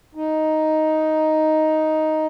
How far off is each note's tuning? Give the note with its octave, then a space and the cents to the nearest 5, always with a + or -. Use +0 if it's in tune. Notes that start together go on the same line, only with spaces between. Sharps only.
D#4 +5